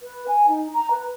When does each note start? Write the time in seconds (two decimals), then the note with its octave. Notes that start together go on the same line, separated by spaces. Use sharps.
0.02 B4
0.28 G#5
0.48 D#4
0.74 A#5
0.91 B4